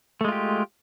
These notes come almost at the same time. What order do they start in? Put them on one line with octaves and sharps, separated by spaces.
A3 G#3 F4 G4